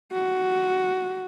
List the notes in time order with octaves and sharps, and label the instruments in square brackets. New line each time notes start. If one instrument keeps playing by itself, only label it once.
[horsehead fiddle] F#4